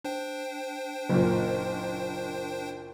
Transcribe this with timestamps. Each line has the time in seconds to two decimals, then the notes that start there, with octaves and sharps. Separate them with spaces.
0.04 D4 C5 G5
1.09 F#1 A#2